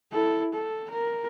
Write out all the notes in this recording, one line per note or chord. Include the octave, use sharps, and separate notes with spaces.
E4 A4
A4
A#4